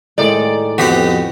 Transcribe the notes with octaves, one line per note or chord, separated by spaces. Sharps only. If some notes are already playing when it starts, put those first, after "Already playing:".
A2 D#3 G#3 D5
F2 B3 F#4 G4 F#5